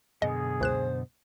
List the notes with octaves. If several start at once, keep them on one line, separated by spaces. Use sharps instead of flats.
F#2 B2 D3 G#4 D#5
C#2 C5 F#6 E7